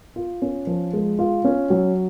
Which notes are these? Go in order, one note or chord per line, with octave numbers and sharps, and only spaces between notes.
F4
C#4
F3
G#3
F4
C#4
F#3